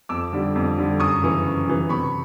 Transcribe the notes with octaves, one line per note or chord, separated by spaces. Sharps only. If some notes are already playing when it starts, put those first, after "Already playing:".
F2 D6 E6
D3 G3
F2
D3 G3
F#2 C#6 D#6
C#3 E3
F#2
C#3 E3
C3 B5 C#6